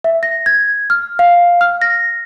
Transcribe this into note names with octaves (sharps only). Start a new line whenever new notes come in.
E5
A#6
G#6
F6
F5
F6
A#6